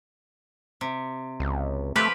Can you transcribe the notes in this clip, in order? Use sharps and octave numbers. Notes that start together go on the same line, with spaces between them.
C3
C#2
F3 A3 G4 B4